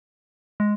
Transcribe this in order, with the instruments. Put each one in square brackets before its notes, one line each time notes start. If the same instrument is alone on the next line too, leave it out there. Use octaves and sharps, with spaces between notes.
[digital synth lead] G#3